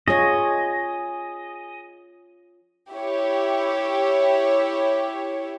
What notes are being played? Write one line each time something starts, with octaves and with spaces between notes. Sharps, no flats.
F4 G#4 C#5 D#5
E4 G4 C#5